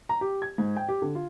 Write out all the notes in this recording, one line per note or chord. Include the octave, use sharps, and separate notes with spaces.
A#5
G4
G#6
G#2
G5
G4
D3
F4